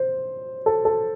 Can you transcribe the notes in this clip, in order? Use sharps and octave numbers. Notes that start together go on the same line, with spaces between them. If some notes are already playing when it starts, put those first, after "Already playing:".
Already playing: C5
A4
A4